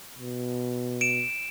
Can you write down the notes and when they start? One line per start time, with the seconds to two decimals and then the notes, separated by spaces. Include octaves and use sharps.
0.18 B2
1.01 D7 E7